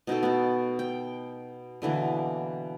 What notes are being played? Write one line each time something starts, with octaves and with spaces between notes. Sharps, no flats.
B2 D#4 F#4 A4
B3 F#4
G5
B2 D3 E3 A#3